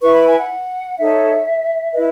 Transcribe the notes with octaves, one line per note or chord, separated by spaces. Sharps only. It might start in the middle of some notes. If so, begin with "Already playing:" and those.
E4 B4 C#6
B5
G#5
F#5
D#4 A4 C#5 E5
E4 B4 D#5